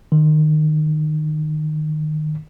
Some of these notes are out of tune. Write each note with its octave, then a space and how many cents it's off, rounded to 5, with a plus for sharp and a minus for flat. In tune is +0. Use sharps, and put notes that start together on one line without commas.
D#3 -25